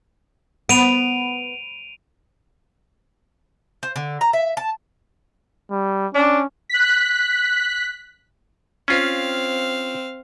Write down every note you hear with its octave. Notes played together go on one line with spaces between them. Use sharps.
B3 D7 D#7 F7
C5
D3
A#5
E5
A5
G3
C#4 D4
F#6 B6
C4 C#4 F4 F5